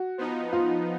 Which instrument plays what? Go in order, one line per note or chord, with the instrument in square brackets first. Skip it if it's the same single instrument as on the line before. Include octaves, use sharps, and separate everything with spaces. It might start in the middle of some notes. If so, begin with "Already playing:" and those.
Already playing: [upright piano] F#4
[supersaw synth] F3 B3 D#4
[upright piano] F4